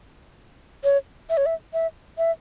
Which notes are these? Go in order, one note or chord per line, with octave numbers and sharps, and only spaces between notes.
C#5
E5
C#5
E5
E5
E5